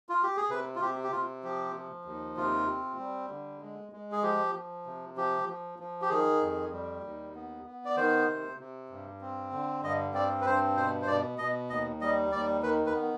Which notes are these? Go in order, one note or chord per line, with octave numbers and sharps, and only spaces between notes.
F4
G4
G#4
C3 B4
F4
C3 G4
G4
C3 F4
F3 G4
F3
D#2
C3 F4
C4
G3
D3
G#3
G#3
G#4
F3 G4
F3
C3
F3 G4
F3
F3
G4
D#3 G#4
F2
G3
D#2
B3
B3
D5
D#3 C5
C3
C3
G2
C4
D3
G2 D#5
C4 D5
B4
G2 C5
B2 C5
C5
B2 D5
B2 D#5
D#2 D#5
G3 D#5
D#2 D5
D#3 B4
B4
B3